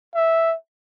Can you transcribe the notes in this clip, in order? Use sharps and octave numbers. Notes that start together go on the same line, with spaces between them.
E5